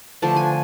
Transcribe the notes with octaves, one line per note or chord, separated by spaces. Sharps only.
D3 F3 A3 D4 A5
G#5